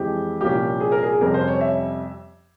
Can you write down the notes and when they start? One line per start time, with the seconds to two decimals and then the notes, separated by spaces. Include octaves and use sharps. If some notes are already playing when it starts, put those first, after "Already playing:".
Already playing: F2 E3 G#3 C4 G4
0.41 C2 A#2 F3 A#3 C#4 G4
0.80 G#4
0.92 A#4
1.03 G#4
1.21 F2 C3 G3 C#4 A#4
1.34 C5
1.48 C#5
1.61 E5